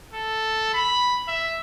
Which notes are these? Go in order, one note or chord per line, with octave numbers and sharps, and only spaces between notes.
A4
B5
E5